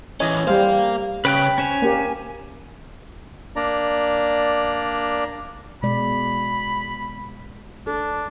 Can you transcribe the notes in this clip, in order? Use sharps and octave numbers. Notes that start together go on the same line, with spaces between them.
E3 C#4 D#5 G#5
G3 A#3 C5 F5
C#3 B4 G5 F#6
C#4 C5 C#5 G#5
A#3 G4
A#3 D4 D5 A#5
B2 G#3 D5 B5
D4 A4